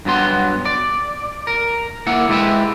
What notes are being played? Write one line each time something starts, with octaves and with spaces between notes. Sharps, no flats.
G2 F#3 B3 C6
D5
A#4
A#3 E4 F#5
G#3 E4 G4 B4 E5